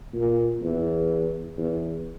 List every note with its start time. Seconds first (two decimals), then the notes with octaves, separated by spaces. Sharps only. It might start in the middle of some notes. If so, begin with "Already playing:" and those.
0.14 A#2
0.62 E2
1.57 E2